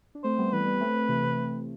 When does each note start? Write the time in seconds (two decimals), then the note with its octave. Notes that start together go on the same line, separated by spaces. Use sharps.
0.15 D4
0.24 A3 C4 C5
0.38 G3 B3
0.52 E3 G3 B4
0.66 G3 B3
0.81 A3 C4
1.09 C3 E3
1.23 C3